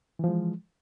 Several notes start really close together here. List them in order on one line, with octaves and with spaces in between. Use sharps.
E3 F3 G#3